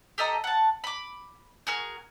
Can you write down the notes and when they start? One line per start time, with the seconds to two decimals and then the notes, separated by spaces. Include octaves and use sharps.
0.18 G4 A4 D#5 A#5
0.44 F#5 A5
0.84 B5 D6
1.67 F#4 G#4 A#4